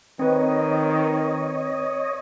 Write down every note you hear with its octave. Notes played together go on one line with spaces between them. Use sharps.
D#3 C4 B4 C#5 D#5